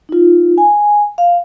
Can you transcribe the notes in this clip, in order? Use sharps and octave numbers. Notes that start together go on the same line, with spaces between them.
D#4 F4
G#5
F5